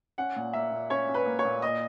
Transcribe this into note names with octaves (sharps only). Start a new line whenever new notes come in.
C#4 F#5
A#2
A#3 E5
A#2
C#4 C#5
C#4
B4
A#3
C#5
A#2
A#2 D#5